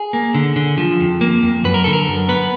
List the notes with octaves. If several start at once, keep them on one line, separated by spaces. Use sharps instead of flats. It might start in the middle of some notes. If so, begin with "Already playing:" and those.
Already playing: G#4
A#3
D3
D3
F3
F2
A#3
F2
F#2 B4
A#4
D3 A4
A#4
F#2
B3 B4